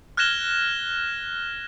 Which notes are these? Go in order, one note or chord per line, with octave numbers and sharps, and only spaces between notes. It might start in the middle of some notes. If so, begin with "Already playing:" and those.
F6 F#6 G#6 A#6 E7 G7